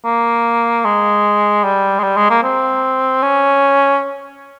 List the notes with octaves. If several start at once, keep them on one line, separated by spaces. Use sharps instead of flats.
A#3
G#3
G3
G#3
G3
G#3
A#3
C4
C#4